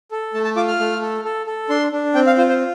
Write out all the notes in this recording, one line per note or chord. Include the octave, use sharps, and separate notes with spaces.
A4
A3 A5
A5
F4 D6
F6
A3
A4
A4
A4
D4 C6
D4
C4 G5
F5
F4 C5
C5